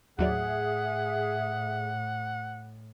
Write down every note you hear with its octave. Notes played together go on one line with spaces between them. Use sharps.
D#2 A2 F#3 G#4 D5 E5 F#5